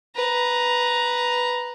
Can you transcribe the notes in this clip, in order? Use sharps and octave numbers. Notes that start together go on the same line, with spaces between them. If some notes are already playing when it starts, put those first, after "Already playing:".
B4 A#5